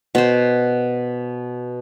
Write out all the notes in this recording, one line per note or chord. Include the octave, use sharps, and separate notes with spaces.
B2 C5